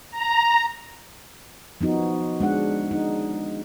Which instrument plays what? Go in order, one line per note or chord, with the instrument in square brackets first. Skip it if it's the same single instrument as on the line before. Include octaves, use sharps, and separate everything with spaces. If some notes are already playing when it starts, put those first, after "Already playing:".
[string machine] A#5
[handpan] F3 B3 D#4 F#4
G#3 D4 F#5
D#4